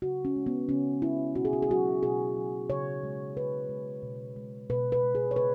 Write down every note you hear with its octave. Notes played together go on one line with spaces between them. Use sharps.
C#3 F#4
C#4
G#3
B3
C#3 C#4
G#3 E4
B2 F#4
G#4
F#4
G#4
F#3 F#4
B2 G#4
F#3
C#3 C#5
G#3
C#3 B4
G#3
B2
G#3
B2 B4
B4
G#3
G#4
C#5
C#3 B4